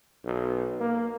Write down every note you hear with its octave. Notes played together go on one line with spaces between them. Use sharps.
B1
A#3